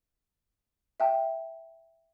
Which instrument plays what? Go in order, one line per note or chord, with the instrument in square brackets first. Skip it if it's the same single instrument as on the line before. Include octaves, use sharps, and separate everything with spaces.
[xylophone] E5 G5 A5